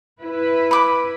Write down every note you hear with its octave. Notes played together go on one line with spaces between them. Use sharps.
E4 B4
B5 D6